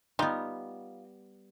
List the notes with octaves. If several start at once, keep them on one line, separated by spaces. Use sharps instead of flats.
G3 B3 D#4 F4